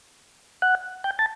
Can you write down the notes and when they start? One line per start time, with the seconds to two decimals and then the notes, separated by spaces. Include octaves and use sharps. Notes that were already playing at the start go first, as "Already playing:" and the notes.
0.62 F#5
1.04 G5
1.19 A5